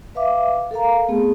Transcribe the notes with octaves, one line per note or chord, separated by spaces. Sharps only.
B4 E5 F5 D6
A4 A#4 F5 A#5
A3 B3 C4 G#4